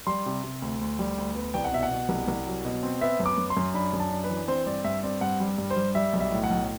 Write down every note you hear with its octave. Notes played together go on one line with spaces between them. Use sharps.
G3 C6
C3
C3
D2
D2
G3
D2
B3
C2 G5
F#5
B2 E5
F#5
B2
C2
C2
F#3
B2
C4
B3 E5
F#2
D6
F#2
C6
F#2
D4 B5
F#2
A5
D4
B4
E3
C4 C5
G2 D5
G2 E5
C4 D5
G2 F#5
G3
G2
C5
G3
G3 E5
B1
E5
A2
F#5
B1